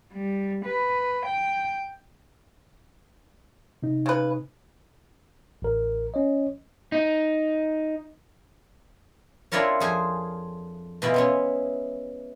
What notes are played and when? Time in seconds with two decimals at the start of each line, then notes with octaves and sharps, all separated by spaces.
0.13 G3
0.65 B4
1.28 G5
3.82 C3 D#4
4.06 C#3 B4
5.62 A1 A#4
6.14 C#4 C#5 D#5
6.92 D#4
9.52 C4 D4 E4 F4 A#4 C#5
9.80 F2 G#4 C5 G#5
11.02 B2 E3 G#3 E4 F4
11.14 B3 C#4 E4